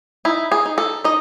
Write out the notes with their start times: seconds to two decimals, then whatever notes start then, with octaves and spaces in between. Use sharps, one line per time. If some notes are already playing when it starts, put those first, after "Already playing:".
0.25 D#4 E4
0.52 G#4
0.65 D#4
0.78 A4
1.04 D#4 D#5